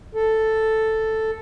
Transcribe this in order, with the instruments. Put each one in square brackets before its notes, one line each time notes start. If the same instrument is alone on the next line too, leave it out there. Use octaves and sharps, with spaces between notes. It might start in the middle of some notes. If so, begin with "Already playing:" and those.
[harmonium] A4